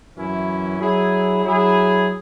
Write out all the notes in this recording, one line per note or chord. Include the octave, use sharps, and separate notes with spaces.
F#2 E3 C#4 E4
F#3 E4 G#4
F#3 E4 G#4